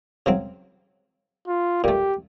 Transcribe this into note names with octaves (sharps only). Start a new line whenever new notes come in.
C#3 F#3 C4
F4
A#2 A3 G4